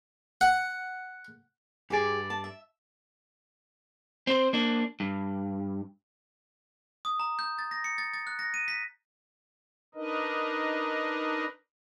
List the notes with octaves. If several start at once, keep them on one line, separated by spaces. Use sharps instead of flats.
F#5
G2 G4 G#4 D5
A5
E5
C4 C5
A#3 D4
G2
D#6
A#5
G6
A6
A#6
C#7
A6
A6
F#6
A#6
D#7
B6
D4 D#4 A#4 B4 D#5